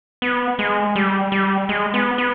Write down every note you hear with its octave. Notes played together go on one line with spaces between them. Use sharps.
B3
G#3
G3
G3
G#3
B3
B3